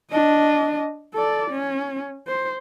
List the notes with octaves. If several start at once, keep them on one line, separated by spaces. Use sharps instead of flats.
D4 D#5
A4 D5
C#4
C5